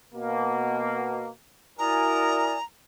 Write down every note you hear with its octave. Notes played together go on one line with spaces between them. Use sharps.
B2 A#3
E4 F#4 A#4 D5 G#5 A#5 D#6